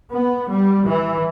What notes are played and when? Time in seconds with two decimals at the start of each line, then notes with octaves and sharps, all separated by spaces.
0.14 B3
0.50 G3
0.87 E3